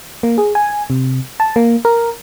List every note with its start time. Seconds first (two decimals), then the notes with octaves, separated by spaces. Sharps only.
0.23 A#3
0.38 G#4
0.55 G#5
0.90 C3
1.40 A5
1.56 A#3
1.85 A#4